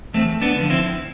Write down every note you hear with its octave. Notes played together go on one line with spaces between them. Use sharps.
E2 A3 C4
B3 D4
D3 F3
C4 E4